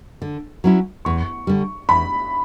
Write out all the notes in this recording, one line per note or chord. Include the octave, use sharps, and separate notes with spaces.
D3
F#3 C#4 E4
E2 C#6
D3 G3
E2 B5